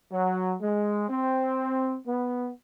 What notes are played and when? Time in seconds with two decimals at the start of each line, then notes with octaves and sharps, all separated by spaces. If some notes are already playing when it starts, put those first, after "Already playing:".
0.12 F#3
0.61 G#3
1.09 C4
2.06 B3